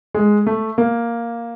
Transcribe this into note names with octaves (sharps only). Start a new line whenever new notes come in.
G#3
A3
A#3